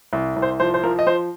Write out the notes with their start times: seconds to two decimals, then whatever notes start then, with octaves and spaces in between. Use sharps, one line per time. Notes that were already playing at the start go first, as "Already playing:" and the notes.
0.13 C2
0.36 C2
0.42 C5
0.60 F3 C5
0.74 C5
0.83 F3 A#4
0.99 D#5
1.07 F3 C5